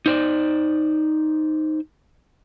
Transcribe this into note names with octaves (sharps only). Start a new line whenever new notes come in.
D#4 C5 D5